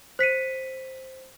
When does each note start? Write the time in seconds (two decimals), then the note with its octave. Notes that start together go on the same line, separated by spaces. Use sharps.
0.19 C5 B6 C#7 D#7